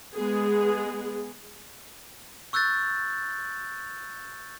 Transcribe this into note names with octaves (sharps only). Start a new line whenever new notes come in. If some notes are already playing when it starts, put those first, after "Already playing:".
G#3 B3 G#4
C#6 E6 F#6 G6 A6